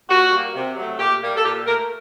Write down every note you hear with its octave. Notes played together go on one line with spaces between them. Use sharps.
A#2 F#4
G3 A#3
C3
F#3 A3
A#2 G4
G3 A#3
A4
A#2 G4
A3 A#4